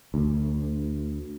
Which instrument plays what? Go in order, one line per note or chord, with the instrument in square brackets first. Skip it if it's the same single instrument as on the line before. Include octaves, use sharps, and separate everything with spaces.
[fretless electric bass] D2